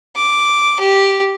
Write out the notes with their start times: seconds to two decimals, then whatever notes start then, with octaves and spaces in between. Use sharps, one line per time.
0.16 D6
0.79 G4